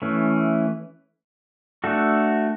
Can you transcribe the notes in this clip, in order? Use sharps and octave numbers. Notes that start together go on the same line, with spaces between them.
E3 A3 C#4
A3 D4 F#4 A4